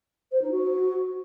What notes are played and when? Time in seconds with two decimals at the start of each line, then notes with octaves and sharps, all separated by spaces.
0.31 C5
0.41 D#4
0.51 F#4